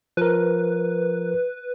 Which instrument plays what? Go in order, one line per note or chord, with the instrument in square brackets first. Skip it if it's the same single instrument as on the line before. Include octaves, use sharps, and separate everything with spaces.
[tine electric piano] F3 A#4 [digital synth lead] B4